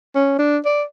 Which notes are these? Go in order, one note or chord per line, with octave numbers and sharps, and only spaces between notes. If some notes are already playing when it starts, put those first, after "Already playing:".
C#4
D4
D5